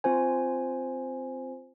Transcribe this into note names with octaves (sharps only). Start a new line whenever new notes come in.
C4 F4 C5 G#5